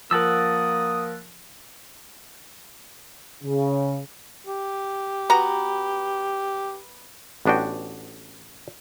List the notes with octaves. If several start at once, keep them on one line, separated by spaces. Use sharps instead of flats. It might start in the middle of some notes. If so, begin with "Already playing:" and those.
F3 A#3 A#4 F#5 A5 D#6 E6
C#3
G4
B3 F#4 A#5
A1 B3 D4 F#4 G5